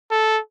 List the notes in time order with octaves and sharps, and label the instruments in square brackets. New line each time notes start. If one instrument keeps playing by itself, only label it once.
[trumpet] A4